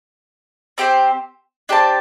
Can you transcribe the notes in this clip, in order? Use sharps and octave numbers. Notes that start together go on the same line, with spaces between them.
C4 G4 C5
D4 G4 C5 A5